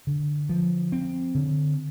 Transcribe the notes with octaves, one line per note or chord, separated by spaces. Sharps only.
D3
F3
C4
D3